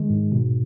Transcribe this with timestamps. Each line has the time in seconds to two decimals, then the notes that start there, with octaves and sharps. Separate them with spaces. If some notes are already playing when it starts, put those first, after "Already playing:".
Already playing: D#3 G#3
0.10 G#2
0.32 B2